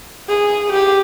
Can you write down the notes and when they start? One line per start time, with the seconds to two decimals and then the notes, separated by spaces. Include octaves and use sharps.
0.29 G#4
0.72 G4